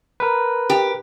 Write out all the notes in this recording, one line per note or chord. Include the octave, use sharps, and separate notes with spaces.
A#4 B4
G4